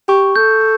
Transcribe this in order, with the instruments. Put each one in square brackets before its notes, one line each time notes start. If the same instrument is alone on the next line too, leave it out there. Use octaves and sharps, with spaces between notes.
[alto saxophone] G4 [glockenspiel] C#6
[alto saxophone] A4 [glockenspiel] G6